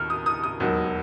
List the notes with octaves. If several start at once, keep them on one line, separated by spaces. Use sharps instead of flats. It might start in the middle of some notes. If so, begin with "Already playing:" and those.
Already playing: D#2 F6
D#6
D#6
D#6
E1 D#2 D#3 F#3